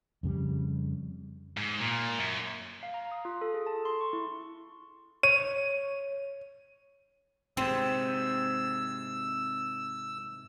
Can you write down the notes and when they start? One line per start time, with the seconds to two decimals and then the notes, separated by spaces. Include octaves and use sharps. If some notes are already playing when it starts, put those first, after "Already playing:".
0.23 F2 C#3 G3
1.57 G#2
1.80 A#2
2.19 F#2
2.83 F5
2.94 A#5
3.12 D#6
3.25 F4
3.41 A4
3.54 G#4
3.67 A5
3.85 C6
4.01 C#6
4.13 E4
5.23 C#5 D#7
7.57 G#2 C3 C4 E6